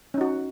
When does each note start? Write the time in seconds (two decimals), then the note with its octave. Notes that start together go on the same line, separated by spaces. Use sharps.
0.14 C#4
0.18 D#4
0.21 F#4